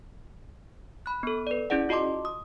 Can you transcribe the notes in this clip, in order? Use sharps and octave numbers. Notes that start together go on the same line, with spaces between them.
B5 F#6
B3 A4
B4 D5
C#4 E4 G#4 D5 F#5
F4 F#4 D#5 A5 C6 D6
D#6